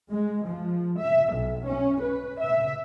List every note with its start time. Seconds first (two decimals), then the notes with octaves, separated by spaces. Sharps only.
0.13 G#3
0.48 F3
1.01 E5
1.35 B1
1.69 C#4
2.02 B4
2.42 E5